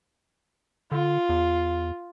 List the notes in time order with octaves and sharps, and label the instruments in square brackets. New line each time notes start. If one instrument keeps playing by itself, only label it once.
[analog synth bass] D3 [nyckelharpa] F4
[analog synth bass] E2